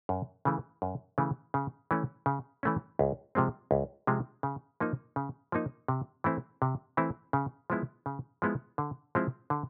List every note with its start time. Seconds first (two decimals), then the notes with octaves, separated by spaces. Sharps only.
0.09 F#2
0.45 C#3 E3 A3
0.82 F#2
1.18 C#3 E3 A3
1.54 C#3
1.91 E3 A3 C#4
2.26 C#3
2.63 E3 A3 C#4
2.99 C#2
3.35 C3 F3 G#3 C4
3.71 C#2
4.07 C3 F3 G#3 C4
4.43 C#3
4.80 F3 A#3 D#4
5.16 C#3
5.52 F3 A#3 D#4
5.88 C3
6.24 E3 A3 C4 E4
6.62 C3
6.97 E3 A3 C4 E4
7.33 C#3
7.70 F3 G#3 B3 E4
8.06 C#3
8.42 F3 G#3 B3 E4
8.78 D3
9.15 F3 G#3 C4 E4
9.50 D3